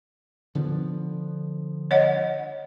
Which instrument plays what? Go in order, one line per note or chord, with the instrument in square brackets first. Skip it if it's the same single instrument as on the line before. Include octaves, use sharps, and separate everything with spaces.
[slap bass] D3 F3 B3
[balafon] C#5 D#5 F#5